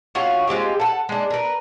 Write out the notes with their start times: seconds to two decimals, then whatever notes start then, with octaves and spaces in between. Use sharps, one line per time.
0.15 C#4 F4 F#4 F5
0.47 G#3 C4 F4 G4
0.80 A4 F#5
1.09 G#3 D4
1.30 A#4 B4